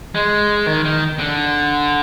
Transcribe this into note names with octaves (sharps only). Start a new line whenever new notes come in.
G#3
D#3
D#3
D3